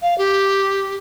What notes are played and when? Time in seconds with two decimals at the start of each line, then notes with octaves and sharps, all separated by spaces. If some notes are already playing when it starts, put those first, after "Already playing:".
0.02 F5
0.18 G4